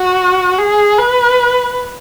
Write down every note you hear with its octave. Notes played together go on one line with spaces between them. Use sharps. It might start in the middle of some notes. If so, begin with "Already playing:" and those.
Already playing: F#4
G#4
B4